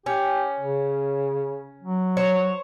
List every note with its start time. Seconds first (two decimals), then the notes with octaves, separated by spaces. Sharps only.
0.06 C#4 G4
0.60 C#3
1.83 F#3
2.17 C5 C#5